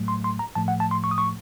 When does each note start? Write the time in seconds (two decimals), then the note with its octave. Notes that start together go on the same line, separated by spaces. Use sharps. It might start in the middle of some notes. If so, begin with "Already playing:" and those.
Already playing: A2 F#3 A3
0.08 C6
0.24 C6
0.39 A#5
0.55 A2 F3 A3 A5
0.68 F#5
0.80 A5
0.91 C6
1.04 C#6
1.11 D#6
1.18 C#6